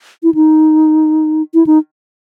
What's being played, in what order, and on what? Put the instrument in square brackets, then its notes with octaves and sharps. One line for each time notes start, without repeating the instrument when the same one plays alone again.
[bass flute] E4
D#4
E4
D#4